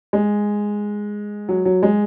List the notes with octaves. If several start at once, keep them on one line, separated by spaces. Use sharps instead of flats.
G#3
F#3
F#3
G#3